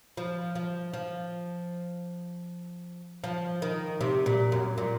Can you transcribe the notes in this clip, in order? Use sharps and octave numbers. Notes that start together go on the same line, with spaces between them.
F3
F3
F3
F3
D#3
C3
A#2
F#2
A#2